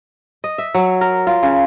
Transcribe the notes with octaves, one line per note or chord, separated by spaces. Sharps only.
D#5
E5
F#3
A#4
F4
C#3